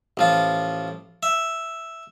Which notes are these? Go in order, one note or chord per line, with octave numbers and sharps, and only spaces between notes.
A1 F3 F4
E5